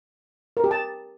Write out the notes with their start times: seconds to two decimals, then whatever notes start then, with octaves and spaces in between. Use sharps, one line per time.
0.57 A#4
0.64 G4
0.71 A5